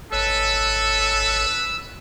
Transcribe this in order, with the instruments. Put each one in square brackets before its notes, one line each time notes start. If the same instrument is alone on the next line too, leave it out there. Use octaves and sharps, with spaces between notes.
[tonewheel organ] G#1 C#5 [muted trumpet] A4 [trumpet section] B4 [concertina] E6